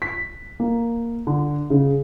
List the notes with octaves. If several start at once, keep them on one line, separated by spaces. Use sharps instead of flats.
B6
A#3
D3
C#3